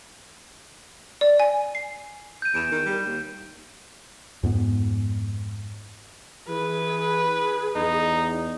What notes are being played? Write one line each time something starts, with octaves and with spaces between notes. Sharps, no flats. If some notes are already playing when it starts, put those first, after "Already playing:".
D5
G#5
C7
G6 D#7
E2 D7 E7
D#3
G3
D#2
F2 G#2 B3
E3 G#4 B4
E2 D#4